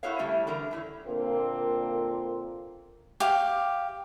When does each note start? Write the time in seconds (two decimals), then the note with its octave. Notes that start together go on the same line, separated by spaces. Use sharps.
0.03 E4 F#4 A4 A#4 C#5 F5
0.18 C#3 G3 A3 C#4 E4 A4
0.47 D3 E3 A#4
0.71 A2 E4 C#5
1.07 A#2 D3 A#3 C4 F4 A#4
3.20 G4 F5